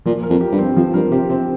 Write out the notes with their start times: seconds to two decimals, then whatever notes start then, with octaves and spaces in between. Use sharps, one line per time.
0.05 A#2 F3
0.23 A#4
0.30 F2
0.41 G4
0.52 G2
0.59 C4
0.76 F2 F3
0.94 G2 A#4
1.11 C3 G4
1.29 C3 C4